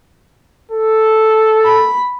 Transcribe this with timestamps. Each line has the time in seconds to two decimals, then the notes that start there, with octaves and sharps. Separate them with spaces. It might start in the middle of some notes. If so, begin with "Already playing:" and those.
0.72 A4
1.64 B5